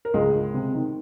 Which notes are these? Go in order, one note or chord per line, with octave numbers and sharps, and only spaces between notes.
A#4
C#2 G#3 G#4
C#2
C3
D#3